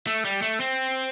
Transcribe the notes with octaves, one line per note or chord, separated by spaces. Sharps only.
A3
G3
A3
C4